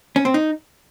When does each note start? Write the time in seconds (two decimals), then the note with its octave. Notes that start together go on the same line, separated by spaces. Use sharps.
0.16 C#4
0.25 C4
0.34 D#4